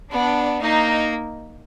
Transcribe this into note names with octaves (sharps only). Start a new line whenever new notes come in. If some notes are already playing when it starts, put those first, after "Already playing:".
B3 D4
A#3 D#4